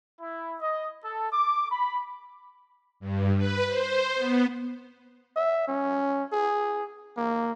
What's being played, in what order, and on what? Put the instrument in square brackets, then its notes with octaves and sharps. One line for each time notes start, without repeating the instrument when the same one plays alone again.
[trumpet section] E4
D#5
A4
D6
B5
[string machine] G2
B4
C5
B3
[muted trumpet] E5
C#4
G#4
A#3